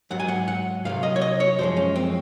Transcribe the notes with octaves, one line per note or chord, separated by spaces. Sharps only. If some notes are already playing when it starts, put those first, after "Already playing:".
G#2 F#3 F#5
G#5
F#5
F#5
C2 C3 F#3 F5
D#5
C#5
D#5
C#5
F#2 F3 G#3 C5
C#4
C4